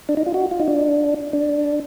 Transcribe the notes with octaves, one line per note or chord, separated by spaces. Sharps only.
D4
D#4
F4
F#4
F4
D#4
D4
D4